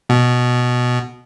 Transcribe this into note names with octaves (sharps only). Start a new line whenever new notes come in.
B2